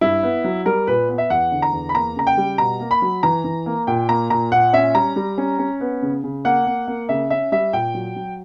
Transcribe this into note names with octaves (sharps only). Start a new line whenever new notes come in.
G2 E4
B3
F#3
G3 A#4
A#2 B4
B3
E5
E2 F#5
D3
A#5
E2
B5
A#3 A#5
C#3 A#5
G5
G3
B2 A#5
A#3
B5
F#3
E3 A#5
E3
A#3
A#2 G5
A#3 A#5
A#2 A#5
A#2 F#5
C#4 E5
G3 A#5
G3
C#4
C#4
B3
C#3
C#3
A#3 F#5
A#3
A#3
C#3 E5
C#4 E5
G3 E5
A#2 G5
F#3
F#3